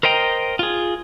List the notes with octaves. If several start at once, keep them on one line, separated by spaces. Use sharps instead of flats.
A#4 C5 D#5 G5 A#5
F4 G#4